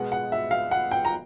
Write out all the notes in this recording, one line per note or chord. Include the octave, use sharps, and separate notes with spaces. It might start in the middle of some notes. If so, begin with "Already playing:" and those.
Already playing: B2 G#3 B3 F#5
F#5
E5
F5
F#5
G5
A#5